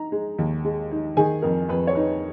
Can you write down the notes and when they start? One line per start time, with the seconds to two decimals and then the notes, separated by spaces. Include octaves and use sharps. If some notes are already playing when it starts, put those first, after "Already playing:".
Already playing: D#4 A#5
0.12 G#3
0.39 D#2
0.65 G#3
0.91 D#4
1.17 D#3 G#4 G#5
1.42 F2 A#4
1.69 F2 B4
1.87 C#5
1.95 D#4 B4